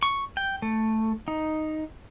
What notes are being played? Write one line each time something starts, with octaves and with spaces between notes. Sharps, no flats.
C#6
G5
A3
D#4